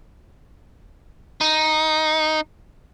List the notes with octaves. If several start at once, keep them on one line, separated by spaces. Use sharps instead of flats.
D#4